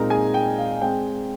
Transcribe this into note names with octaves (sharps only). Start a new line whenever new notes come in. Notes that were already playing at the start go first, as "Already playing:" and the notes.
Already playing: A#2 G#3 C4 D#4 A#4 A#5
G#4 G#5
G5
F5
G#3 C4 G5